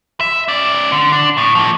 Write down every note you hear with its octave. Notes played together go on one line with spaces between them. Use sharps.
E5
C#4 D5
D3
D4
A2
F3 A#3